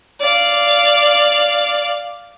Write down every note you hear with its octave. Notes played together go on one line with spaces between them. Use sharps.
D5 F5